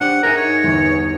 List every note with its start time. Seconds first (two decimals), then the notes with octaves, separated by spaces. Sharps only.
0.01 D4 G4 C5 F#5
0.23 D#4 G#4 A#4 E5 G#5 A#5
0.37 C#5
0.63 G1 E2